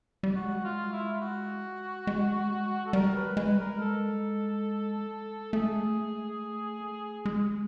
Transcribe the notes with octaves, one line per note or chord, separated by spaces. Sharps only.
G3
G#3 F#4
F4
E4
F4
F#4
G#3
A4
G3 A#4
B4
G#3 B4
G3
G#3 A#4
A4
A3 G#4
G#3
A3
G#3